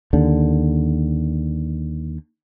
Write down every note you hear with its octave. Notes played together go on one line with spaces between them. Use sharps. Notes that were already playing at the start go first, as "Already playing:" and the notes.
D#2 D3